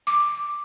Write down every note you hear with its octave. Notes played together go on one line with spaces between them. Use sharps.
D6